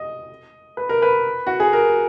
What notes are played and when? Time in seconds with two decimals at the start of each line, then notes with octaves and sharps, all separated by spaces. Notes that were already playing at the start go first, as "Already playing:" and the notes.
Already playing: D#5
0.77 B4
0.89 A#4
1.02 B4
1.47 F#4
1.60 G#4
1.73 A#4